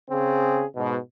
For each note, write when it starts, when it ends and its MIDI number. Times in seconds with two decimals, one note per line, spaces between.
0.10 0.64 49
0.10 0.64 60
0.10 0.64 68
0.76 0.97 44
0.76 0.97 47